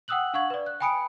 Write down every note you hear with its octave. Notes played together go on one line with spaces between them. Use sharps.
F#5 G5 D#6 E6 F#6 F#7
D4 F5 F#5 C#6 G#6 F#7
B4 D5
F#6
G5 G#5 B5 D#6 C#7 D7